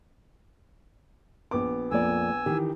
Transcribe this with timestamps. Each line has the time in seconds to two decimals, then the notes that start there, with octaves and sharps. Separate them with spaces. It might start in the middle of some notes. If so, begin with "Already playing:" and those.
1.51 A#1 B3 D6
1.91 F2 A#3 D5 G#5 E6
2.46 D#3 E3 G4